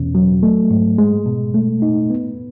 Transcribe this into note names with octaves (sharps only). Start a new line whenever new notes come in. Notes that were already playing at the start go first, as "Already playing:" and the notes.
Already playing: E2 B2 C#4
F#3
A3
G#2
G#3
B2
A3
D#4
B3